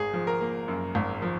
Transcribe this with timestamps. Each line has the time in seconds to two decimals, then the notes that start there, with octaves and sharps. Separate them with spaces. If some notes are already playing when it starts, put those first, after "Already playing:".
Already playing: G#1 G#4
0.13 F3
0.27 A#4
0.41 A#3
0.68 F#2
0.95 G#1
1.22 F3